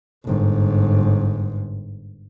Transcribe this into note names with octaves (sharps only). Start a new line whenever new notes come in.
G1 G#2